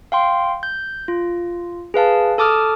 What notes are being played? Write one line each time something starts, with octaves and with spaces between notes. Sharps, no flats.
F5 G5 C6
G6
F4
G#4 B4 F5 A5
A4 A5 D6 D#6 F6